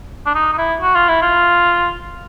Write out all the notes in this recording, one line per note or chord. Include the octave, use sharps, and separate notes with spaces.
D4
D#4
D#4
E4
F#4
F4
E4
F4